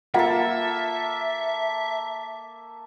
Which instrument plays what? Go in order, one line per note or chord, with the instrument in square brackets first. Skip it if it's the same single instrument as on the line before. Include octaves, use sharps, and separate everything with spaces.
[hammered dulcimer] A#3 A4 [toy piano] F4 F#5 [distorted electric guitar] E5